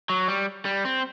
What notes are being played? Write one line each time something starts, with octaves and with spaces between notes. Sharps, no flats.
F#3
G3
G3
C4